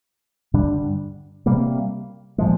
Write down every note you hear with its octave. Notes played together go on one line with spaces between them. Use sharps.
G2 D3 G3 D4
C3 G3 A#3
A#2 F3 G#3